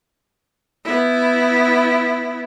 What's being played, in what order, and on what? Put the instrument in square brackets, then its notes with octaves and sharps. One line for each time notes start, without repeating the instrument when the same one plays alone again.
[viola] B3 E4